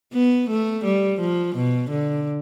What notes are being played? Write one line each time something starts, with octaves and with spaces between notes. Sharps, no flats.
B3
A3
G3
F3
B2
D3